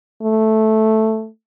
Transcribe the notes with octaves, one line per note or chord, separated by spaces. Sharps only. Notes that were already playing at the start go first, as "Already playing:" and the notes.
A3